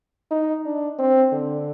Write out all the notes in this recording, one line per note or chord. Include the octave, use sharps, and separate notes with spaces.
D#4
D4
C4
D3